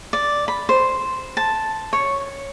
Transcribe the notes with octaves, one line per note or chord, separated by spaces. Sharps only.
D5
B5
C5
A5
C#5